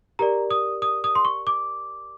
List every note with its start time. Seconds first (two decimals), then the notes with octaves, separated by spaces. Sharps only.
0.19 G4 A#4 D5 A#5
0.51 D#6
0.82 D#6
1.04 D#6
1.15 C6
1.25 C#6
1.47 D6